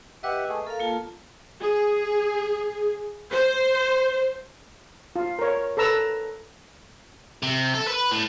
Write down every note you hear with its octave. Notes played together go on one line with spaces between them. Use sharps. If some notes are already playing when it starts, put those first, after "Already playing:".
G4 B4 D#5 E5 F#5
A3 G#4
A4 A#4 F5
A#3 F4 A5
G#4
C5
F4
A#4 C#5
A4 B4 A#5 E6
C3
A4
B4
A2